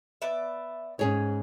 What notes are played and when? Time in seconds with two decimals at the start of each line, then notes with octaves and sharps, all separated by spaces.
0.22 B3 D5 E5
0.99 G#2 C#4 G#4 C#5